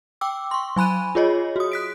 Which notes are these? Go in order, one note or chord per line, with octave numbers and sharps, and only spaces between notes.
G5 D6 E6
C6 C#6
F#3 G#5 B5 F#6 D#7
F4 G#4 C#5 D#5
F#4 D#6
F#6 B6 D7